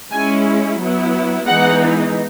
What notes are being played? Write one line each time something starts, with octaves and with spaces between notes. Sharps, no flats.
G#3 C#4 E4 G#5
F#3 B3 E4
E3 G#3 B3 D#4 F#5